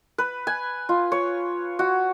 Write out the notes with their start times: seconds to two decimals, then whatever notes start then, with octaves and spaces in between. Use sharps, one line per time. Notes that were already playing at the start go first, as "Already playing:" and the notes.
0.18 B4
0.47 G#5
0.89 F4
1.12 C#5
1.79 F#4